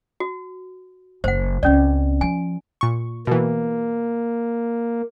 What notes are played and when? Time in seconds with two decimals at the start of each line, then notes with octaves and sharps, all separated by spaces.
0.20 F#4
1.24 F#1 C5 F#5
1.63 C#2 C4 C#4 D5
2.21 F3 G#5
2.81 A#2 C#6
3.27 B2 E3 A#3